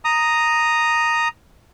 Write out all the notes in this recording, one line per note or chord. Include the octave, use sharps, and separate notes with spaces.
A#5 D#6